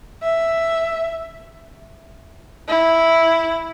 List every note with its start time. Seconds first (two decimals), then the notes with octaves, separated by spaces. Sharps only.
0.23 E5
2.68 E4